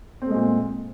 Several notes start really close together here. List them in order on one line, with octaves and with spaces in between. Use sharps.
C4 A3 G#3 A#2